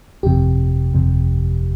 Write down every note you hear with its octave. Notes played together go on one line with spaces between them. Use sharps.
G1 F2 C3 G4
G1 F2 C3